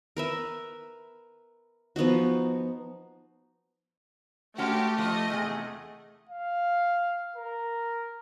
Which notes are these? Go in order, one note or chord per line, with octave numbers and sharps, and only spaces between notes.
A#4 B4 E5
F3 B3 D#4 F#4
G#3 A3 C#4 F#4 G4
F3 G4 D#5
E2 C3 G#4
F5
A#4